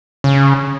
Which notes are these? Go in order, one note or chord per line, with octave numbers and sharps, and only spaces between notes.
C#3